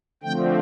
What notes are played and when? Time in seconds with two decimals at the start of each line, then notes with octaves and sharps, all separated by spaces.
0.23 D3 F3 A3 C4 G5